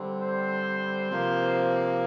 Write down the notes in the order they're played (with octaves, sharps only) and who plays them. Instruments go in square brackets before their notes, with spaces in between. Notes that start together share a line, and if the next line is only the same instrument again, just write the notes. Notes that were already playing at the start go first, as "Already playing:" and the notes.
Already playing: [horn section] D3 G3 C4
C5
C3 F3 A#3